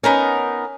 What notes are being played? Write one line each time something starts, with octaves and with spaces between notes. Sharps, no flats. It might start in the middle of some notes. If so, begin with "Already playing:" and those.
B3 C#4 D#4 A#4